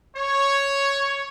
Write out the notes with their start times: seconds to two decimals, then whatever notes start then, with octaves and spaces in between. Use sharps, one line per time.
0.16 C#5